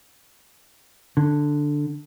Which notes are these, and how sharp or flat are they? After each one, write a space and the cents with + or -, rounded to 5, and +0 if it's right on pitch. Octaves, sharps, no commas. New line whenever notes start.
D3 +5